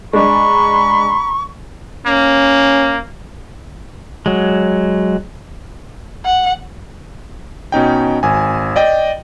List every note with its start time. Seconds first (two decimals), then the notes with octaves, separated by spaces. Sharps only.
0.13 G#3 D4 A#5 B5 C#6
2.06 A#3 C#4
4.26 F#3 G#3
6.26 F#5
7.72 B2 C#4 D#4 G5
8.23 G#1 G#5
8.76 D5 D#5 G5